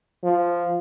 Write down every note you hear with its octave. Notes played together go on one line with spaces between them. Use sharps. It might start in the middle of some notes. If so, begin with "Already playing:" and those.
F3